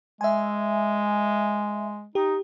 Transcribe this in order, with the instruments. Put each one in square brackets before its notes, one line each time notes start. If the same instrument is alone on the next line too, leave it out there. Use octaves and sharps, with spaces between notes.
[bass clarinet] G#3 [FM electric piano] E5 G#5
[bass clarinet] D#4 [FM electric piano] G4